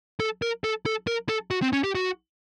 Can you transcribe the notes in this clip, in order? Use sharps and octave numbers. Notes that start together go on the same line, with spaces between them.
A4
A#4
A4
A4
A#4
A4
F#4
C4
C#4
G4
F#4